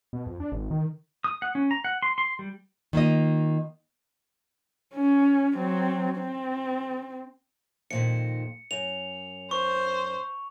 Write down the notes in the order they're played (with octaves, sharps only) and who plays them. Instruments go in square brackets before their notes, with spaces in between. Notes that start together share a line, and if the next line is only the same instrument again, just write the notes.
[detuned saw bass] B2
F2
D4
G#1
D#3
[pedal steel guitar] D#6
F#5
C#4
A#5
F#5
C6
C6
G3
[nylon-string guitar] D#3 A#3 F4 D#5
[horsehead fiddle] C#4
F#3 C4
C4
[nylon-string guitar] F2 A#2 D#3 [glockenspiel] C#7
[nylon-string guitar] F#2 [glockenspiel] F7
[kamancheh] C5 [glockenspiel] C#6